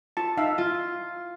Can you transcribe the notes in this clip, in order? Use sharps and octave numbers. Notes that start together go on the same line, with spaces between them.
F4 A5
D#4 E5 F5
F4